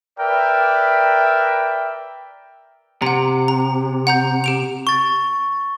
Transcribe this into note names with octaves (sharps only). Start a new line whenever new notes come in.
A#4 B4 D5 E5 G5
C3 F#5 A#5
A#5
F#5 A#5 G6
G4 D7 F7
C#6 A6